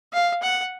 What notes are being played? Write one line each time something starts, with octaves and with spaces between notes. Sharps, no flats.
F5
F#5